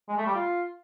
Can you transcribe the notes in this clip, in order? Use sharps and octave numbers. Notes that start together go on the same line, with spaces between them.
G#3
A3
G3
F4